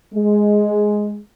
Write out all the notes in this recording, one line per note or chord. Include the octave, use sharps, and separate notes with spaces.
G#3